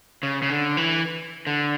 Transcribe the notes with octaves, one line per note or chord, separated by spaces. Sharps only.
C#3
C#3
D3
E3
D3